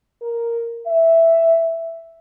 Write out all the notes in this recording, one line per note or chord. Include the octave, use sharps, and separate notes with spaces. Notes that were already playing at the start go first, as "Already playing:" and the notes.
A#4
E5